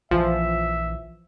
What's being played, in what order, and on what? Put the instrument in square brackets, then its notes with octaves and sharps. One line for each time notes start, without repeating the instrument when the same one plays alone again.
[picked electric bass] A#1 E3 [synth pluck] F3 [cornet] E5